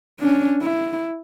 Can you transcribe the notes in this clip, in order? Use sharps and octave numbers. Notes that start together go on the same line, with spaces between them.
C#4 D4
E4